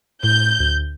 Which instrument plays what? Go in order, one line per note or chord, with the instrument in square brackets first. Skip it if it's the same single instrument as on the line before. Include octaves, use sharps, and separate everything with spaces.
[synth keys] A2 [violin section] G6
[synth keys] D2